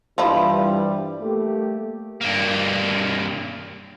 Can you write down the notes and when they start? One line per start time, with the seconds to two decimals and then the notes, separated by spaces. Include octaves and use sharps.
0.18 G2 E3 F3 G3 E4
1.20 A3 A#3 G4
2.21 G2 A#3